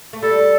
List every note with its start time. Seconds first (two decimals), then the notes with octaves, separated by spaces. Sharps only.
0.13 A3
0.23 G3 A4